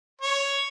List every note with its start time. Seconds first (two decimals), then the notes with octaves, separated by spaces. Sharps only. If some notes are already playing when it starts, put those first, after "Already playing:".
0.22 C#5